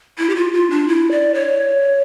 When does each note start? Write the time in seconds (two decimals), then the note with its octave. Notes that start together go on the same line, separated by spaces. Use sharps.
0.18 E4
0.30 G4
0.36 F4
0.53 F4
0.70 D4
0.88 E4
1.11 D5
1.34 C#5